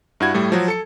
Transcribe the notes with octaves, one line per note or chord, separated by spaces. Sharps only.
G2 E4 F#4 G#6
A2 G3 A3
F3 F#3 F#4
A4 C#7